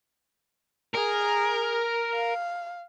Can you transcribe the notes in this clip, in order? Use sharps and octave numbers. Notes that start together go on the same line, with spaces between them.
G#4 A#4
F5